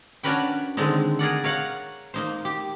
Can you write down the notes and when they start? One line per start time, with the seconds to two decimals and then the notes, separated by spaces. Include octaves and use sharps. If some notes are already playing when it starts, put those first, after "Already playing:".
0.23 C#4 D4 F#4 A#4 B4 G5
0.77 D3 D#3 G#3 C4 D#4
1.19 G#4 A#4 D5 F#5
1.44 A#4 C#5 F5 F#5
2.14 A#3 D#4 C5
2.45 G4